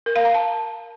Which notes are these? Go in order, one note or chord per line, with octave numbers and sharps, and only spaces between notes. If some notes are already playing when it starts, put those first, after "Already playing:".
A#4
F5
A#5
A5